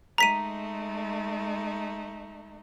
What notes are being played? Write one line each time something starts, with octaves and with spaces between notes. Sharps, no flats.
G#3 A3 D#4 A#5 B6 D#7